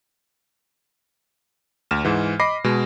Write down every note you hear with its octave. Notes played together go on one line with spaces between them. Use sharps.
D2 F6 E7
G#2 E3
D#5 B5 D6 A#6 C7
B2 G#3